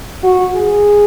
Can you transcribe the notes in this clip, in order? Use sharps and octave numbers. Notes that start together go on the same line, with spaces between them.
F#4
G#4